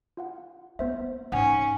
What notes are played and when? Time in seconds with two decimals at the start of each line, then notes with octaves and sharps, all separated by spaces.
0.17 F4 F5 F#5
0.79 A#3 B3 C5 E5
1.32 G#2 C#4 F#5 G#5